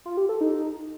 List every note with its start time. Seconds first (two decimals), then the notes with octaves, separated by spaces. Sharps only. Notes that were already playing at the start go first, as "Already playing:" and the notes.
0.06 F4
0.17 G4
0.29 A4
0.41 D#4